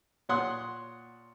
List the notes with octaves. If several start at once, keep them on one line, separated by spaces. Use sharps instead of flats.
A#2 C#5 F#5 C6 D#6 F#6